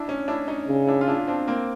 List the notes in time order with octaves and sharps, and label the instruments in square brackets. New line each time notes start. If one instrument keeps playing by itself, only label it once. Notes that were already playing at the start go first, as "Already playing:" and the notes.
Already playing: [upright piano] D4 E4
C#4 D#4
D4 E4
C#4 D#4
[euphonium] C#3
[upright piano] D4 E4
F4
D4 E4
C4 D4
A#3 C4